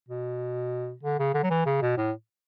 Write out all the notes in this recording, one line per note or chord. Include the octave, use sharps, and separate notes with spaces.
B2
D3
C#3
D3
F#3
E3
C#3
B2
A2